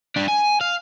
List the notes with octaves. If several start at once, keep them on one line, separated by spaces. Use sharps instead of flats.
G3 D4
G#5
F5